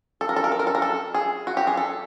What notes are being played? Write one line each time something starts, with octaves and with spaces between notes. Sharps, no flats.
A4
A#4
A4
A#4
A4
A#4
A4
A#4
A4
G#4
F#4
G4
G#4
A4